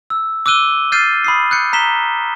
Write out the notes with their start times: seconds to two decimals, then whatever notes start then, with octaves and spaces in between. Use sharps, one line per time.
0.10 E6
0.46 D6 E6 F#6 D#7 G7
0.92 F6 G6 A6 C7 D#7
1.24 B5 D#6 C7
1.51 F#6 G6 C#7
1.73 A#5 B6 E7 G7